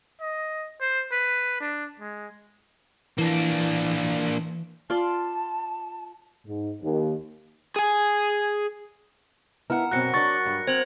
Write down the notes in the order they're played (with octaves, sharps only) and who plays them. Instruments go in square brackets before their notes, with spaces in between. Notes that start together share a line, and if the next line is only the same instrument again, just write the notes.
[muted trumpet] D#5
C5
B4
D4
G#3
[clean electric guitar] E3 [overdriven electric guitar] A#3 D4
[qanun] F4 D5 C6 [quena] A5
[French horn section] G#2
D#2
[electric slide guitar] G#4 G#5
[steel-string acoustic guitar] B3 E4 [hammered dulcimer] A#4 F#5
[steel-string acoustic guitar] F#2 B2 C4 [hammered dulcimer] F#3 [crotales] F#6 A#6 C#7
[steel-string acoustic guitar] D4 C#5 D5 [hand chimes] C#6 A6
[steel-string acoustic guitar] G2
[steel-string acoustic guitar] C4 [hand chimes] C5 [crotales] G#6 F7 F#7